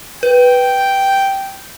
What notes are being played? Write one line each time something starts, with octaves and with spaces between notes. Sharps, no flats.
B4 G5